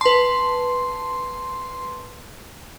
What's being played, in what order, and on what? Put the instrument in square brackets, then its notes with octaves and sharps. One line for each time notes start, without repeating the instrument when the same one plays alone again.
[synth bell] B4 A5 [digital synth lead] C6